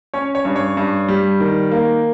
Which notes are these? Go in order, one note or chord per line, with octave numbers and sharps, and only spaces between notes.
C#4 C#5
C#5
G2
C#5
G2
G3
D#3
A#3